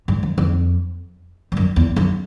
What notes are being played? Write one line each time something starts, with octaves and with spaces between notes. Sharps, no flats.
G2
F#2
F2
G2
F#2
E2
F#2